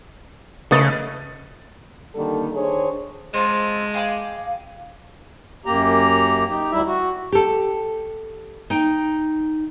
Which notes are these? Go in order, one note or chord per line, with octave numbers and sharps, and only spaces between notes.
C#3 A3 B4 D#5 D#6 A6
D3 D#3 G3 A#3 A4
D#3 D4 G#4 C5 C#5
G#3 C4 F4 A4
G#4 F5 G5 D6
F#2 A#3 G4 A#5
D#4 G4
D2 G3 E4 E5
F#4
G4 A4
D#4 G5